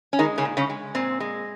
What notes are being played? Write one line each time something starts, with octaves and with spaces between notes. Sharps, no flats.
C#4
D#3 G#3 D#4
C#3 C#4
A#2
C#3 C#4
G#3
A#2 C4
G#3